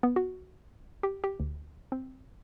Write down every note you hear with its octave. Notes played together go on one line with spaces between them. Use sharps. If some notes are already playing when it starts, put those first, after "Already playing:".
B3
F#4
G4
G4
D2
C4